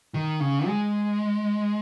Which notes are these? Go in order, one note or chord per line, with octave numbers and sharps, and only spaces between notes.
D#3
C#3
G#3